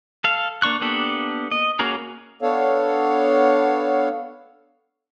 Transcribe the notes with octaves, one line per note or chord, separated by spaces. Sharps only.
A4 F5
A#3 D4 C#6 F#6
A#3 B3 D4 G4 A4
D#5
A#3 C#4 F#4 G#4 A#4
B3 D4 A4 C#5 F5